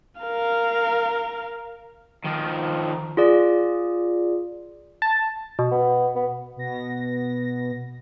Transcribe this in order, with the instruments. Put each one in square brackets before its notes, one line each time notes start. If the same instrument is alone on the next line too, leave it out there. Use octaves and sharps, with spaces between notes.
[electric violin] A#4 F5
[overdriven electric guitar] D#3 F3
[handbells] F4 G#4 D5
[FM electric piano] A5
[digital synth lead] B2
[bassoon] B3
B3
[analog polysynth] B2 B3 A#6